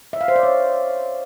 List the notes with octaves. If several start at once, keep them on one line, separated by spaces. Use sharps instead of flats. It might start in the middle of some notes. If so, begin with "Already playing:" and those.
E5
F5
C5
D5
C#5